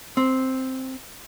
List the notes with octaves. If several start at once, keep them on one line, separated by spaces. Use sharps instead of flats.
C4